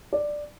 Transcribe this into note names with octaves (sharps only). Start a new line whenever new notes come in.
D5